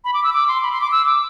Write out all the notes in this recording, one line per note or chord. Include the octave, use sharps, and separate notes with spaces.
B5
D6
E6
D6
C6
B5
C6
D6
E6
D6